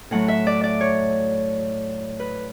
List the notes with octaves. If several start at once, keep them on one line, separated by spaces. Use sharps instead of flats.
A2 F#3 A3 F#5
E5
D5
D5
C#5
B4